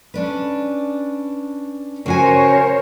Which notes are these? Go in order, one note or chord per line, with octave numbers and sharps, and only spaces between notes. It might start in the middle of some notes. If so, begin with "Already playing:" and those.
C#4 D4 B4
C#3 F#4 A#4 C5 C#5 G#5